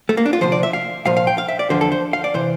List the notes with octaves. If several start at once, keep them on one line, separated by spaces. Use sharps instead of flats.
A3
A#3
D4
F4
D2 C3 F3 C5
D5
E5
F5
C2 A#2 F3 F5
F5
G5
F5
E5
D5
E2 D3 F3 C5
A4
C5
F5
D5
C3 E3 C5